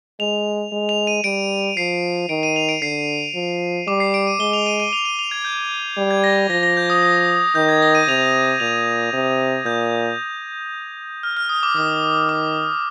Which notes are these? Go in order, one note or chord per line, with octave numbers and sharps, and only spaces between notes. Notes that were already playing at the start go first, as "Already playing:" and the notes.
G#3 F7
G#3
F7
D#7
G3 D7
F3 C7
D#3 D7
D#7
F7
D7
D3 C7
F3
G3 D6
C7
D7
D#7
G#3 G7
F7
D#7
D#7
F7
D#7
F7
G#6
G6
G3
G#6
A#6
F3 A#6
A#6
G6
D#6
D#6
D#3 G6
G#6
A#6
D#7
C3 F7
A#2 F7
C3
A#2 G6
F6
F6
D#6
D6
D#3 D#6
D6